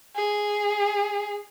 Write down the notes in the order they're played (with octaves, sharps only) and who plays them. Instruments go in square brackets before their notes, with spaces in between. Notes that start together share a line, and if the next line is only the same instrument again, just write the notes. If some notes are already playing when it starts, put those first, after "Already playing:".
[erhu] G#4